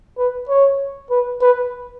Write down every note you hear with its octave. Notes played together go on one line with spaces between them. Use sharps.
B4
C#5
B4
B4